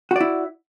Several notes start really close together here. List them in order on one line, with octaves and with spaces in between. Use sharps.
F#4 D5 E4